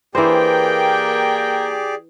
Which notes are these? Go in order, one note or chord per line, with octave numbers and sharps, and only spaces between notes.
E3 A#3 G4 G#4 C5 D5 G5